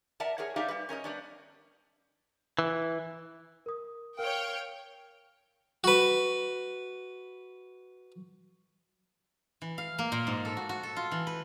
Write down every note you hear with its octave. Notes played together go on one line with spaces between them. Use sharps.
A#4 D5 E5 F#5 A5 A#5
G#4 A#4 C#5 F#5
D#4 G4 D5 E5 F5
G3 B4
C#4 A#4 C#5 D#5
G3 B3 D4
E3
A#4 D#6
A#4 C#5 F5 G5
F#4 B4
E3
F5
A#3
A#2
G#2
A4
F#4
F#4
A4
F4
E3
B4